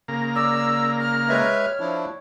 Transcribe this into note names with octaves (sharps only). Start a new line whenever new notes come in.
C#3 A#3 A#5
D5 E6
F6
G#3 B4 C#5 E5 G5
F3 D4 E4